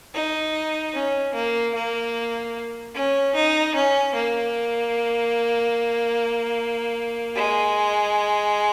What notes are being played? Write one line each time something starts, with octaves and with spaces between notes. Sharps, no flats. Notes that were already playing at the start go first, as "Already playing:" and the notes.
D#4
C#4
A#3
A#3
C#4
D#4
C#4
A#3
G#3